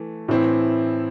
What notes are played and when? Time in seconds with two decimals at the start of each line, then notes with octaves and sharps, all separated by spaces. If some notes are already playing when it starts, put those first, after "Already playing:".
Already playing: E3 A3
0.28 A2 E3 C4 E4